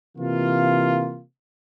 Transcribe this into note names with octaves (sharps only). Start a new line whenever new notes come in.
C3 E3 A#3 F4